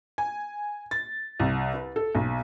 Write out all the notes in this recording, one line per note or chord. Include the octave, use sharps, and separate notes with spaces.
G#5
A6
C2
B4
A4
B1